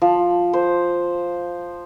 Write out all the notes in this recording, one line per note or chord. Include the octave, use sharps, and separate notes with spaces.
F3
C5